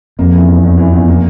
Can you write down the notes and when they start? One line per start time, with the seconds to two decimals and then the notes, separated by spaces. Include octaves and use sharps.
0.19 F2 A#3
0.33 E3
0.47 E2
0.63 E2
0.77 E3
0.93 E2
1.08 A#3